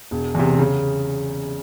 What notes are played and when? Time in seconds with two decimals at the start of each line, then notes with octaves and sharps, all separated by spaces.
0.11 E1
0.34 E2 C3
0.58 C#3